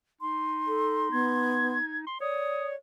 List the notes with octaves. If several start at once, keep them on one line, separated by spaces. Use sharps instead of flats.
D#4 C6
A4
B3 G#6
C6
C#5 D5 D#6